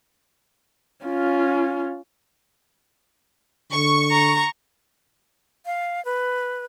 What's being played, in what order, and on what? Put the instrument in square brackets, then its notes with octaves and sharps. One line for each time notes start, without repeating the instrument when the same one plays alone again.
[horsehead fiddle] C#4 F4
[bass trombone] D3 [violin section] C#6
[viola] A#5
[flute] F5
B4